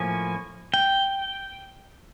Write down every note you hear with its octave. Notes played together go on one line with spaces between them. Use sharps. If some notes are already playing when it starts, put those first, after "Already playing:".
Already playing: A2 F3 A#3 C#4 G#5
G5